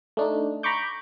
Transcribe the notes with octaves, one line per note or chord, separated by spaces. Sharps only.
A3 D4 D#4
A#5 B5 C#6 D6 G6